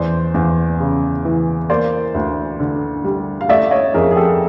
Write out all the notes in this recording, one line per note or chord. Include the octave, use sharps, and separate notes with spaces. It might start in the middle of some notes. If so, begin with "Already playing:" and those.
Already playing: E2 C5 D5
E2
C#3
E3
A#3 C5 D5
D2
D3
G3
F5
A3 D5 E5
C#5 D#5
F2 G#4 A#4
G#4
G4 A4